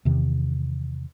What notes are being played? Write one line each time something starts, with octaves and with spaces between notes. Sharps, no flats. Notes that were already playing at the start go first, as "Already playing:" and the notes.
E2 C3 D#3